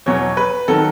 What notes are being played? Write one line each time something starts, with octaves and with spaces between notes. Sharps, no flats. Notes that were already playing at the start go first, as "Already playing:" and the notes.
E2 B2 F#3 C#5
B4
D#3 F#3 A4